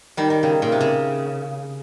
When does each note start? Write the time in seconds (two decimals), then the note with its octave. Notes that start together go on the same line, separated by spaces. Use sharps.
0.17 D#3 G3
0.30 D#3
0.43 C#3
0.62 A#2
0.72 C3
0.81 C#3